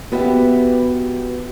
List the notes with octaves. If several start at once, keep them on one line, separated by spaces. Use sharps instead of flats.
B3 F#4 G4 E5